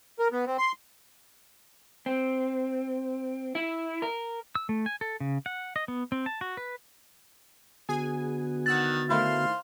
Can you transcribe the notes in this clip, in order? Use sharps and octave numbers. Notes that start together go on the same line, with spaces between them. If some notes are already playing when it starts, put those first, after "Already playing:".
A#4
B3
C4
C6
C4
E4
A#4
E6
A3
G#5
A4
C#3
F#5
D#5
B3
C4
A5
F#4
B4
D3 B3 F#4 G#4 G#5
D#3 F#5 E6 F#6 A6
D#3 A3 E4 C5 F5